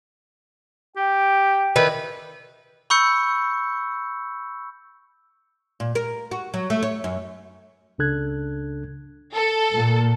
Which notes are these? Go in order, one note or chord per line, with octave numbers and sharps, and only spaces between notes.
G4 G5
D#3 E3 B4
B5 C#6 E6 G6 C#7
A#2
A#4
F#4
F#3
A3
C#5
F#2
C#2 C#3 D4 A4 F#6 G#6
A4
A#2 A#3